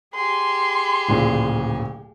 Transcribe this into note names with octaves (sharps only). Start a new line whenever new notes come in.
G4 G#4 C6
D1 A#2 C#3